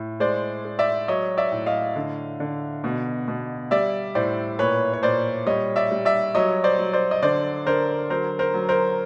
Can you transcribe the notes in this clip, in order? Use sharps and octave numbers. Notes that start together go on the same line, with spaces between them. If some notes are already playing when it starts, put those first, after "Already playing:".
Already playing: A2
G#3 C5 D5
G#3
D5 E5
F#3 C#5 D#5
D5 E5
A2
D#5 F5
D3
D3
B2
B2
G3 D5 E5
A2 C5 D5
A#2 B4 C#5
C#5
A#2 C5 D5
G3 C#5 D#5
D5 E5
G3
D5 E5
F#3 C#5 D#5
C5 D5
F#3
C5 D5
D#5
D3 C5 D5
D3 A#4 C5
F#3 A#4 C5
A#4 C5
F#3
A#4 C5